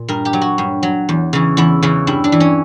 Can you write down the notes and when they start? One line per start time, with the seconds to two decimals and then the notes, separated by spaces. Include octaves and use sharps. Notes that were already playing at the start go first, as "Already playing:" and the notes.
Already playing: A#2
0.08 G2 A#4
0.25 G4
0.33 F#3
0.42 F#4
0.58 G2
0.83 F#3
1.09 E2
1.33 C#3 E3
1.57 E2 E4
1.83 C#3 E3
2.07 G2 E4
2.24 D4
2.32 E3
2.40 C#4